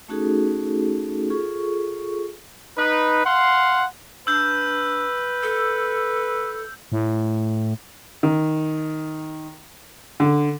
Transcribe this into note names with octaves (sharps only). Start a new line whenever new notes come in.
A3 C#4 D#4 F#4 G#4 A4
F4 G#4 A4 C#6
D#4 B4
F5 F#5 C6
D4 B4 E6 G6
A4
A2
D#3
D3